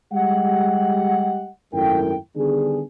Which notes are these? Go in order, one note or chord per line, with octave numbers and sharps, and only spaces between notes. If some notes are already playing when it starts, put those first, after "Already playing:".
G3 G#3 G4 D#5 F#5
G#1 F#2 A3 E4 A#4 G5
D3 D#3 G3 B3 D4 G#4